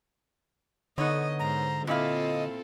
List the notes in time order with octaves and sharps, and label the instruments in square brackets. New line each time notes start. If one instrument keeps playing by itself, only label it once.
[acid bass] D3 [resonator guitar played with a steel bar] B3 D#4 C#5 [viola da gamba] D#5
[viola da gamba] G#2 C5 [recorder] A#5
[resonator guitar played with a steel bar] A#2 E4 F5 [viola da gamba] C4 F4 A4 [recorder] D#5